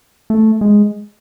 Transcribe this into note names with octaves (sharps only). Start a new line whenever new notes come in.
A3
G#3